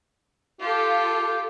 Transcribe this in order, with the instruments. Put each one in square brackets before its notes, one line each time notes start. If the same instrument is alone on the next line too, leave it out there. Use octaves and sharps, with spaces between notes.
[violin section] F4 A4 [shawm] G4